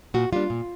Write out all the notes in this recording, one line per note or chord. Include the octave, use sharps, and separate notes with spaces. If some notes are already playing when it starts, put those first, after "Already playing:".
A#2 F#4
G3 A#3 D4 F4
A#2